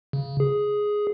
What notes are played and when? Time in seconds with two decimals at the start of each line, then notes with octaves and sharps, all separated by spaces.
0.13 C#3
0.40 G#4